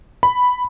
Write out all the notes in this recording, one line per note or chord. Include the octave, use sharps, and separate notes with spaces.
B5